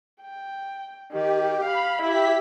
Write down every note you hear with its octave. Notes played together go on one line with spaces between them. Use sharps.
G5
D#3 G4
F5 B5
E4 G4 E5 B6